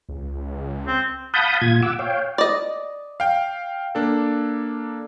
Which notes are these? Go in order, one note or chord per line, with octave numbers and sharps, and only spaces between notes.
C#2
C4
F5 F#5 A5 B5 D#6 G6
A#2 F4 G#6
F#5 D6 E6
C#5 F5 G5
D5 D#5
F5 G5
A#3 D4 A4